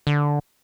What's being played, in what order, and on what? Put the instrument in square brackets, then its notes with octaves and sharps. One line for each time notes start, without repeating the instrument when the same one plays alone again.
[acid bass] D3